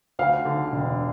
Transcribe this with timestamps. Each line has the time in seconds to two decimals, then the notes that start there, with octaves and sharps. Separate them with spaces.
0.19 D2 F5
0.45 D3
0.72 E1